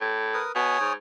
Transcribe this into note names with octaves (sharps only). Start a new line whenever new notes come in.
A2
A#4 B4 D#6
B2 C#5 G#5 D#6
G#2